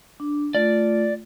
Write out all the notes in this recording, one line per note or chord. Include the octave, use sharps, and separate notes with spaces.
D4
A3 F4 D5